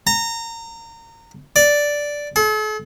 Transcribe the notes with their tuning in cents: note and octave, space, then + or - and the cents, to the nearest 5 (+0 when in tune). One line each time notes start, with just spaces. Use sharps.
A#5 -25
D5 -5
A4 -45